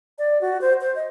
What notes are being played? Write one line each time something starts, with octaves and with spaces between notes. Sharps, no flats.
D5
F#4
C5
C5
D#5